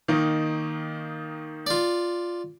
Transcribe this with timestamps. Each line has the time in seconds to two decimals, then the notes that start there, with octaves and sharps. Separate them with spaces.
0.08 D#3 A#3 D#4
1.67 F4 D5